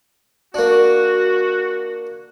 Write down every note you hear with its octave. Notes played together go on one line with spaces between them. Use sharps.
A#3 D4 F#4